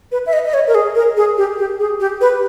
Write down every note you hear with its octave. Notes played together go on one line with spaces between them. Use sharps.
B4
E5
D#5
D#5
C#5
A#4
G#4
A#4
G#4
G4
G4
G#4
G4
B4